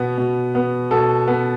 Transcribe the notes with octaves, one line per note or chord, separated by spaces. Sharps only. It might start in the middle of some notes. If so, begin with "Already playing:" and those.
Already playing: B2 B3
B2
B3
B2 A4
B3